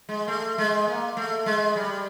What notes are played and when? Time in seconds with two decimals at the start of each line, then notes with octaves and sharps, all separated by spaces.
0.09 G#3
0.28 A3
0.58 G#3
0.87 A#3
1.17 A3
1.46 G#3
1.76 G3